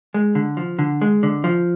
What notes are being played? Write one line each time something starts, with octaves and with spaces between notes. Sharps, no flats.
G#3
D3
F3
D3
G#3
D3
F3